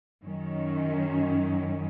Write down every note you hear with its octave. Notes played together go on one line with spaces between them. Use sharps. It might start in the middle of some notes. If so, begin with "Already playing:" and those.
F#2 D#3 F#3 C#4